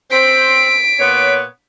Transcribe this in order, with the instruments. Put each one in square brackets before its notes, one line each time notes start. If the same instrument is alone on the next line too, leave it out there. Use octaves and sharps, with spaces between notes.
[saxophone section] C4 C5 [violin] B6 D7
[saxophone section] A#2 B3 C#5